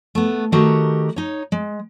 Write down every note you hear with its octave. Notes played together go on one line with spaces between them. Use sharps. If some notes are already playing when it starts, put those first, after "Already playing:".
A3 B3
D#3 A3 F#4 G4 A#4
D#4 C#5
G#3